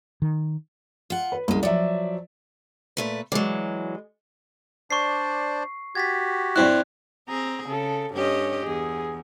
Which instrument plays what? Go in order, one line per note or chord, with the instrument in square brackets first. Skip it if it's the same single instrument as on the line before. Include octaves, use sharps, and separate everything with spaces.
[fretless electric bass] D#3
[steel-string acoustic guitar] F4 F#5
[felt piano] B4
[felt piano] C2 [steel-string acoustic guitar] F#2 G#3
[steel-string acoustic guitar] F3 F#3 [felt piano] D5 E5
[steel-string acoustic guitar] A#2 A3 B4
[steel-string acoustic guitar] E3 F#3 [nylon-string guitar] G#3 D5
[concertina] D4 C5 D5 [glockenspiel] C#6 C7
[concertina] F#4 G4 [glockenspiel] G#6 A6 B6
[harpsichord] G2 C4 E4 [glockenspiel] F#6
[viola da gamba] C4 G#4 [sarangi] A#5
[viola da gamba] C#3 [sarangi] A4
[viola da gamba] G2 G4 D#5 [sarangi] C#4
[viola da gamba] E2 [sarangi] G#4